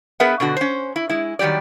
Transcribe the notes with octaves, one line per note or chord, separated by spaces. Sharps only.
B3 G#4 A#4 B4 E5 F#5
B2 D3 F#4
C#4 C5
E4
G#3 E4
D#3 F#3 G3 G4 D5